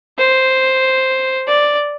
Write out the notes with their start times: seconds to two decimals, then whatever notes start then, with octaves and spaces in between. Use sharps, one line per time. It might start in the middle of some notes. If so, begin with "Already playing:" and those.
0.18 C5
1.47 D5